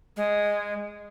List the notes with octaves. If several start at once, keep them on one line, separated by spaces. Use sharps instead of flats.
G#3